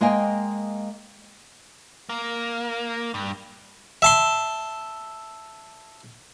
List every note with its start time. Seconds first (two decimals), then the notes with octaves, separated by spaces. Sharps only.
0.01 G#3 A#3 D#5 G5 G#5
2.09 A#3
3.14 G2
4.02 E5 A5 C6